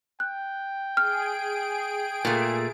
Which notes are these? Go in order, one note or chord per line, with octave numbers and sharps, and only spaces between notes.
G5 F#6
G#4 F6 D7
A#2 A3